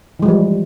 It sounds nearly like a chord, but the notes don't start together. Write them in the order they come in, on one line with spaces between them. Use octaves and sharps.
E3 G#3 F3 G3